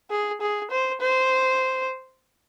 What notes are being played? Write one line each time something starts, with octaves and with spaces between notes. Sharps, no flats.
G#4
G#4
C5
C5